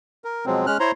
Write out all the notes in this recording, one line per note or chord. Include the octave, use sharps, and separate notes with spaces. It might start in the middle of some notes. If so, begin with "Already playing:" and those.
A#4
B2 F3 F#3 G#3 C4
G#3 C#4 F6 F#6
E4 C5 C#5 A#5 C6